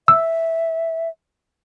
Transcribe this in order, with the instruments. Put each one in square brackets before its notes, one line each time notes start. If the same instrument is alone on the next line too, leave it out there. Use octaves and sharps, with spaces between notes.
[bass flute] E5 [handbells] E6